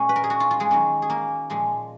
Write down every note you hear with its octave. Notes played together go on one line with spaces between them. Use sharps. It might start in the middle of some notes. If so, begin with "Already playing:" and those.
Already playing: A#2 G#3 C#4
B4
A#4
G#4
F#4
F4
F4
G#3 G#4
D#3 F#3 A#3 C#4
G#4
A#3 A#4
A#2 F3 G#3